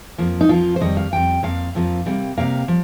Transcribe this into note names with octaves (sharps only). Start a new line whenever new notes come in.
F2 F3 A#3
D#4
F2 F3 A#3 F4
C5
F2 D#3 G3 D#5
F5
F2 D#3 G3 G5
F2 F3 A#3 F5
F2 F3 A#3
C3 G3 A#3
C3 G3 A#3 F5
F3